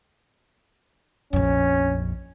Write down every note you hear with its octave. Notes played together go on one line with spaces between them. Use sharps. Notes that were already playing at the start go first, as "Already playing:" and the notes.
A#1 F2 C#4